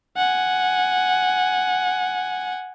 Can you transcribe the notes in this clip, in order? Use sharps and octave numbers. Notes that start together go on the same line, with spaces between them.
F#5 G#5